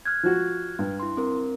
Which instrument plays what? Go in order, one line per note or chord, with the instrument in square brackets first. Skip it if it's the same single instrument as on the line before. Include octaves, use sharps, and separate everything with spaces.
[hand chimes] F6 F#6 G#6
[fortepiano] F3 F#4
G2
[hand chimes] E4 C6
C4 A#4